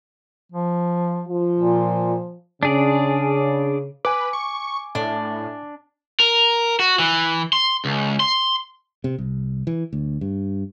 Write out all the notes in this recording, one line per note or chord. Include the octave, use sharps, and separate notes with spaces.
F3
F3
A#2
C#3 D4 G#4 D5
B4 G#5 D6
C#6
A2 D4
A#4
F#4
E3
C6
C#2
C6
C3
C2
E3
D2
G2